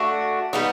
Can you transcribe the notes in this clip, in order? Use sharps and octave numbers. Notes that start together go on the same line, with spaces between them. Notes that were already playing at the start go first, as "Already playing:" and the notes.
Already playing: A3 D4 F#4
G3 B3 D#4